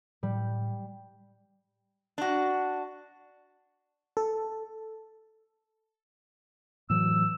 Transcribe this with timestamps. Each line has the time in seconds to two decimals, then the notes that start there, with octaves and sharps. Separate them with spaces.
0.23 A2 G3
2.18 D4 F#4
4.17 A4
6.90 A2 E3 F#3 E6